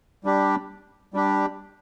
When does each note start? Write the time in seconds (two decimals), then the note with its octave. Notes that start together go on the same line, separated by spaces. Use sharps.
0.24 G3 D4 G4
1.14 G3 D4 G4